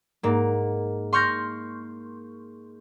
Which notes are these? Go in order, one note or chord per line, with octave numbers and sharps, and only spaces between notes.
G#2 A#3
C6 C#6 F6 G6 A#6